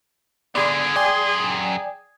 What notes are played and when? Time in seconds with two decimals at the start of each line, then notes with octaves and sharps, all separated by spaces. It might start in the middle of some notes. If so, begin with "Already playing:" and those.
0.55 D3 B3 G#4 D5 B5 C6
0.96 F#2 D5 G5 G#5 C6